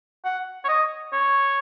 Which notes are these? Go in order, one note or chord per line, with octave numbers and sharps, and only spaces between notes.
F#5
C#5
D#5
C#5